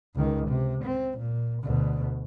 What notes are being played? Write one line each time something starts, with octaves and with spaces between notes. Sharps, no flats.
C#2 D#3
C3
C4
A#2
D2 B2